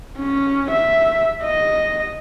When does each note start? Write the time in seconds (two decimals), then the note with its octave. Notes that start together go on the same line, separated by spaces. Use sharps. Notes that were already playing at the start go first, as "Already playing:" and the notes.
0.18 C#4
0.71 E5
1.44 D#5